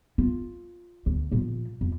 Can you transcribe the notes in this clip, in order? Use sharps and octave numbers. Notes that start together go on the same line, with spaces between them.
F4
D2
A#2 F3
F2